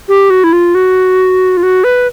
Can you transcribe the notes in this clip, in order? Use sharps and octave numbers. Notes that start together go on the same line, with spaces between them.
G4
F#4
E4
F4
F#4
F4
F#4
B4